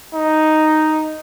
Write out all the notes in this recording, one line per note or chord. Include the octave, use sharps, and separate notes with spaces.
D#4